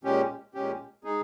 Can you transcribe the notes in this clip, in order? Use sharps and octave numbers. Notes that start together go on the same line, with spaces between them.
A#2 G#3 C#4 G4
A#2 G#3 C#4 G4
G#3 D#4 G#4